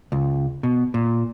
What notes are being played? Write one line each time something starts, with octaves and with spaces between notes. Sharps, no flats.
C#2
B2
A#2